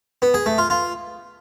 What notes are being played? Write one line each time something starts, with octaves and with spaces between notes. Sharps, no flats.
B3
G#4
A3
F4
F4